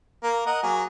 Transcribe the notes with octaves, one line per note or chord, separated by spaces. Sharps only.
A#3 A#4
A#4 D#5 F#5
F#3 A#3 G#4